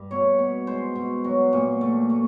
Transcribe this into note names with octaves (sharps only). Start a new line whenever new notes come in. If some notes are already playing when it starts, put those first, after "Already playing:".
Already playing: G2
B2 C#5
B2
G#3 C5
B2
F#3
A#2
A3
A3